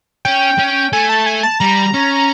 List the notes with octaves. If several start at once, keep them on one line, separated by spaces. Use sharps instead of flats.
C#4 G5
C#4
A3 G#5
A5
G#5
A5
G3 A#5
C#4